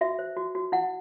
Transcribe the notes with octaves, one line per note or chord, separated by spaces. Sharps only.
F#4 E5
C5
F#4
F#4
E4 F#5